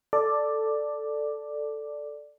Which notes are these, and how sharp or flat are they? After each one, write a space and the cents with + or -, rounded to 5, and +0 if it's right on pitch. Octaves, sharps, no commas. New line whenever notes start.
A4 +0 D5 +0